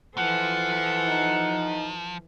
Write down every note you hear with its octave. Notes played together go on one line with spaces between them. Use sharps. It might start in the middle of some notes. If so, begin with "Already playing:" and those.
E3 F3 A4 C5 F#5
D#4